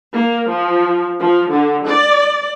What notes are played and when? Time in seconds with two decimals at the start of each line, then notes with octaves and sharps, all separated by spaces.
0.14 A#3
0.48 F3
1.20 F3
1.52 D3
1.85 D5